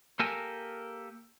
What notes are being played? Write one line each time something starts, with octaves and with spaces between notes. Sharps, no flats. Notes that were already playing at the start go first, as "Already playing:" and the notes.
A#3 G4 A4 A#4 G#5